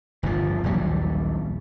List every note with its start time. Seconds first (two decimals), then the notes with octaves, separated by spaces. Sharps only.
0.23 G1 A#2 F3
0.64 A#1 D#2 F#3 G3